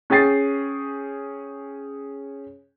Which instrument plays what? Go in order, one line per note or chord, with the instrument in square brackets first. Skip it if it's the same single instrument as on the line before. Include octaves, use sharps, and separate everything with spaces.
[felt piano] C#4 G#4 G5 A6 C7